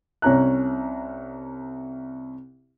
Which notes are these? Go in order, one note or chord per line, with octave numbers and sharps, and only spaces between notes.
C2 C#4 A#5 F#6